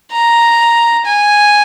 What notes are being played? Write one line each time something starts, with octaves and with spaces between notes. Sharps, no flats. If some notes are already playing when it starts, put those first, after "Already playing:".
A#5
G#5